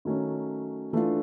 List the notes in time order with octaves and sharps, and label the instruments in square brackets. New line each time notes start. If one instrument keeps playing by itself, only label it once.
[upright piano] D#3 F#3 A3 C#4
E3 A3 D4 F4